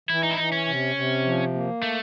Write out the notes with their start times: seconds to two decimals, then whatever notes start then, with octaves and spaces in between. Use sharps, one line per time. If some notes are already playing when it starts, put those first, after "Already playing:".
0.09 E3 E4
0.23 D#4
0.31 E4
0.37 E3 D#4
0.52 C#4
0.67 C3
0.96 C3
1.25 F3
1.54 A#3
1.83 A3